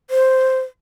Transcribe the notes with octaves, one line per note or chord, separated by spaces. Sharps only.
C5